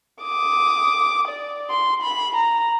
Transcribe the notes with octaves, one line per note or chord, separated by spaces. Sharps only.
D6 D#6
D5
C6
B5
A#5